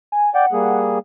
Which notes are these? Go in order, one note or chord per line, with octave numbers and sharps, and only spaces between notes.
G#5
D5 F#5 G5
G3 A#3 G#4